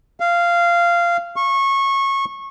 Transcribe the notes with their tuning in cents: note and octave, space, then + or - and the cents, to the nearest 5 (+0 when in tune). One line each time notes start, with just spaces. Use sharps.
F5 -15
C#6 -20